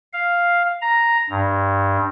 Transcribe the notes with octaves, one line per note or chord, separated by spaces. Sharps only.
F5
A#5
G2